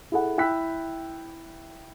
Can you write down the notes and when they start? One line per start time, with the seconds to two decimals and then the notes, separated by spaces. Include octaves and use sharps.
0.12 E4 G#4 A4 F#5
0.38 E4 G5 E6 F#6 B6